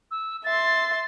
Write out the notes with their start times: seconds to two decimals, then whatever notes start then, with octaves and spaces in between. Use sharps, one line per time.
0.11 E6
0.44 E5 C6 A6